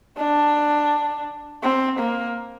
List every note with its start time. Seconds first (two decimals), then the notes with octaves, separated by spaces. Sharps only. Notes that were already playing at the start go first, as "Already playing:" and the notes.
0.18 D4
1.63 C4
2.00 A#3